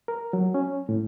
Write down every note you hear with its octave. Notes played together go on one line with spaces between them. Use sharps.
A#4
F#3
C#4
A2